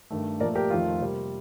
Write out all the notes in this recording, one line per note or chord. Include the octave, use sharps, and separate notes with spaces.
G2 D#3 A3
A#2 F3 A3 A#4 D5
G4 A#4
F2 D#3 A3 F4
C3 G3 A#3